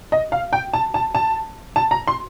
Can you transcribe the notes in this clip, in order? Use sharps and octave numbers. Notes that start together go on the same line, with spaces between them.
D#5
F5
G5
A5
A5
A5
A5
A#5
C6